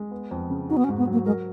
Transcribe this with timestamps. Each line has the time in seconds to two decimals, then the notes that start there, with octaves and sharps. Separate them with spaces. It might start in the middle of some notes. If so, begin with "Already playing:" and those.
Already playing: G#3
0.11 B3
0.31 F2
0.50 C#3
0.69 D#4 F#4
0.76 B3
0.84 C#4
0.88 G#2
0.97 B3
1.07 F#3
1.12 A#3
1.25 G#3 A#4